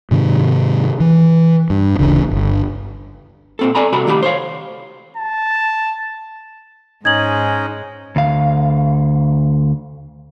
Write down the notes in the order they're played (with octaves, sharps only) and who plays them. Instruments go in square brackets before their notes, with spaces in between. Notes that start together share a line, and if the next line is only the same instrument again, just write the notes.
[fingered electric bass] G#2 C3 D#3
E3
G2
D1 A1 C#3 D4
G1
[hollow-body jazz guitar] A#2 C4 A4
A4 D5 G#5 A#5 B5
C3 F#4 A4 A#5 B5
A2 D#3 G4 G#5 B5
C5 C#5 F5
[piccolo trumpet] A5
[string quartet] G#2 G#3 [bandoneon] C#4 D#4 D#5 [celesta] G#6 F#7
[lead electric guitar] D2 F5